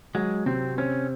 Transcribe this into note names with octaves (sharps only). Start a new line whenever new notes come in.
F#3 G#3
C3 C4
C4 C#4